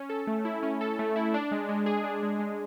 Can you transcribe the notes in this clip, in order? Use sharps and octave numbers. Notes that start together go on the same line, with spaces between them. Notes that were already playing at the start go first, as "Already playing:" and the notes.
Already playing: C#4
A4
A3
E4
C#4
A4
A3
E4
D4
G#3
G#3
G#4
D4
G#3
G#3